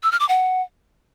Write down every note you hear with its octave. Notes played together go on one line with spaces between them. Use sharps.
E6
F6
D6
F#5